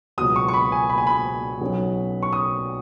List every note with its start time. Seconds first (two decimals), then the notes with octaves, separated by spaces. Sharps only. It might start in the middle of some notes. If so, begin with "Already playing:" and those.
0.18 C#2 B2 F#3 D#6
0.36 C#6
0.48 C#6
0.54 B5
0.72 G#5
0.90 B5
0.98 G#5
1.07 B5
1.61 B1 B2 F#3 C#4
2.23 C#6
2.33 D#6